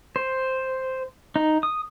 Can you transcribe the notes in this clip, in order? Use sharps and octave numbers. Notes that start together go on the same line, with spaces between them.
C5
D#4
D#6